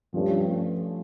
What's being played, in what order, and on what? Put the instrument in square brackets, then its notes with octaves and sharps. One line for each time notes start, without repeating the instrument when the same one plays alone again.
[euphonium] G2 [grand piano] F3 A3 C#4